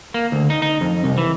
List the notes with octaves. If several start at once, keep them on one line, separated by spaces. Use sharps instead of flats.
A#3
D2
D#4
D#4
F2
C2
E3